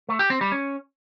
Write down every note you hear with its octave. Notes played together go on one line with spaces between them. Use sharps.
A3
G4
C4
G3
C#4